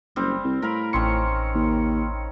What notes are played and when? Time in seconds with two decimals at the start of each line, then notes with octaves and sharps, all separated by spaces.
0.16 F#1 G3 C4
0.44 C2
0.62 A2 A#4 F5 B5
0.93 A1 D#3 C4 C#4 C6 C#7
1.55 D#2